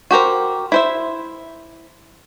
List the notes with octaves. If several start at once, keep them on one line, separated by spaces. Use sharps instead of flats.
F#4 G4 A#4 C5
E4 C5 E5